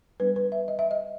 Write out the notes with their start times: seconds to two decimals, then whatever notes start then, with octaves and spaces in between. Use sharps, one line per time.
0.20 G3 B3 D4 B4
0.36 B4
0.52 E5
0.68 D#5
0.79 E5
0.91 D#5